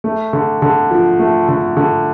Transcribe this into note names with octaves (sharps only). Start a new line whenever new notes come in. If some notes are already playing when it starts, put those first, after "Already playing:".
A3
D3
D3
F3
A3
D3
D3